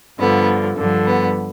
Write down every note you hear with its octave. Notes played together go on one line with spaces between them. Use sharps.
G2 D3 F3 B3
G2 D3 F3
B3